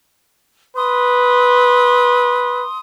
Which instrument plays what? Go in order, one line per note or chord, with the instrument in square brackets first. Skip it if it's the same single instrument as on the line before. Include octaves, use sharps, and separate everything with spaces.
[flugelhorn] B4 [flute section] C6 D#6